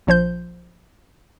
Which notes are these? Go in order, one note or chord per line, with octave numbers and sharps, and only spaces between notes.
A#1 F3 C5 G6